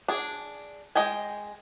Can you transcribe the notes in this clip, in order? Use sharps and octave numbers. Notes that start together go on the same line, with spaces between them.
D4 G#4
G#3 D#5 G5 G#5